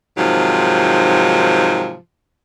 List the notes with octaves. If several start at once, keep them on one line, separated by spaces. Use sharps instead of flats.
G#2 C3 D#3 F3 F#3